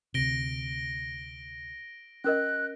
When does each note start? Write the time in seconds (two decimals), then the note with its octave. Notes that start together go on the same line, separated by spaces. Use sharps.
0.14 D2 C3 A#6 D7 G7
2.24 C#4 A#4 D#5 F#6